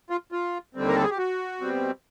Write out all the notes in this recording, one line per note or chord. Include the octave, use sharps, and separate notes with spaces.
F4
F4
D#2 D3 G3 C4
A#4
A4
G#4
G4
F#4
B2 G3 C4